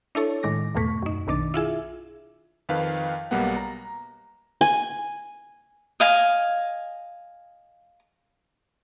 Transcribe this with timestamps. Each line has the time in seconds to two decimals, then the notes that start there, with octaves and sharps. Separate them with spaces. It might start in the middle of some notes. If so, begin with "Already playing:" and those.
0.15 D4 E4 A4 C#5
0.43 A2 D#3 G#3 D6 A#6
0.75 E2 G#2 B2 A3 C#6 B6
1.02 F#2 D#4
1.27 A#1 B2 D#3 D4 D6 A6
1.54 E4 F4 G#4 E5
2.69 F2 D#3 B4 F5
3.31 B1 G3 A#3 B3 F#5
3.56 A#5
4.61 G#5
6.00 D#5 F5 G#5